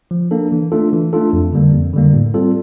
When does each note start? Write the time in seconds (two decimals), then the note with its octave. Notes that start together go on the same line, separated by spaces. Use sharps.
0.11 F3
0.31 A#3 D4 A4
0.52 E3
0.72 A3 D4 F4 A4
0.93 E3
1.13 A3 D4 F4 A4
1.33 F2
1.52 D3 G3 A#3
1.73 F2
1.94 D3 G3 A#3
2.14 A2
2.34 G3 C4 F4 A4